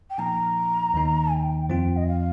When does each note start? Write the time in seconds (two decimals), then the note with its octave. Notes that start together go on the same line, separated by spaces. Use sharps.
0.10 G5
0.18 A#2 F3 A#3 D#4 A#5
0.94 D#2 D#3 A#3 D#4
1.32 G5
1.69 F2 F3 C4 F4
1.96 D#5
2.07 F5